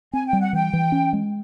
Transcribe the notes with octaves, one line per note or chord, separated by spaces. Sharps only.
C4 G#5
G5
G3
F#5
E3 G5
E3
C#4
G#3